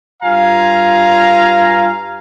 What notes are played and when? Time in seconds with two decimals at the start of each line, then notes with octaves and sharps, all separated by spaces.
0.23 G2 F4 F5 G#5 A#5